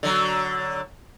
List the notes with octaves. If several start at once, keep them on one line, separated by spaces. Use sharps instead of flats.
D3 F#3